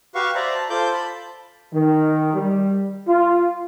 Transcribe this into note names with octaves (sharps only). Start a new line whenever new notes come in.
F#4 G4 B4 F5 C#6
C5 D5 E5 A#5
A5
F4 A4 C5 D6 G6
A5 B5
D#3
G3
F4